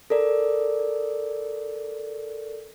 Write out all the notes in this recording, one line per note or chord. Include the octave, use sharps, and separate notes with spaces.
A4 A#4 D5